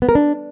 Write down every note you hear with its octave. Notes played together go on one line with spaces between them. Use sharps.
B3
A#4
D4